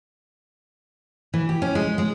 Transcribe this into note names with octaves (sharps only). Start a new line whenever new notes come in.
E3
G4
C#4
G#3
G#3